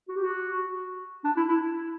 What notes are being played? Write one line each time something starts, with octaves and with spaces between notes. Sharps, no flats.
F#4
G4
F#4
D4
E4
E4